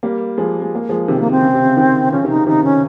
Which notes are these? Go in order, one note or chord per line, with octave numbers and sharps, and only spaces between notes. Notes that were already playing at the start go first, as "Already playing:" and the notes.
G3 A#3
F3 G#3
G#3
A#3
F3 G#3
C3 D#3 C4
A#3
C4
C#3
C3
C#3
C3 D#3
C#3 F3 C#4
C3 D#3
D#4
C#3
C3 D#3 D#4
C#4